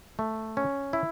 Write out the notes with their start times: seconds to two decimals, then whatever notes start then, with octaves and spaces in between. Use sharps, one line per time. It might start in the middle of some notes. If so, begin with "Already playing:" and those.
0.19 A3
0.57 C#4
0.93 E4